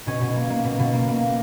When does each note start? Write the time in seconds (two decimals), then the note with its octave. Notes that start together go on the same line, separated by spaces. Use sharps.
0.07 B2 C#4
0.21 B2
0.36 A#3
0.50 A#3
0.65 B2
0.79 B2
0.94 A#3
1.09 A#3